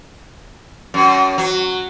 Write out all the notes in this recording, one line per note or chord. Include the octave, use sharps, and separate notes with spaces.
F#2
F#3